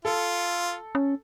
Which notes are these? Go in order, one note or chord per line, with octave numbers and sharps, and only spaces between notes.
F4 A4
C#4